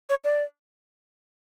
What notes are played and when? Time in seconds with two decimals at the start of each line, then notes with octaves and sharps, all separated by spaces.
0.09 C#5
0.24 D5